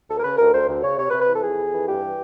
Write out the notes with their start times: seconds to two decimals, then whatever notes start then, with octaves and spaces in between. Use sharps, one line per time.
0.08 D2 A4
0.18 A#4
0.23 C#3 B4
0.37 D2 A#4
0.53 D2 C5
0.68 D2
0.82 C#3 C#5
0.97 C3 C#5
1.09 B4
1.13 C3
1.20 B4
1.27 E3 A4
1.42 F2 G#4
1.58 F2
1.72 E3
1.87 G2 G4
2.02 E3